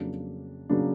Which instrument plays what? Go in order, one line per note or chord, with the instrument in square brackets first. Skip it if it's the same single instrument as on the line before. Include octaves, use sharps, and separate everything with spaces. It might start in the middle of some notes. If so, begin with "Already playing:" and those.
Already playing: [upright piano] F2 C#3 F#3 A#3 D4
C#3 F#3 A#3 D4